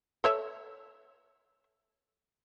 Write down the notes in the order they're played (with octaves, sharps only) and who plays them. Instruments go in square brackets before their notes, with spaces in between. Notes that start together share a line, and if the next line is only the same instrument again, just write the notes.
[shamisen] A4 C#5 E5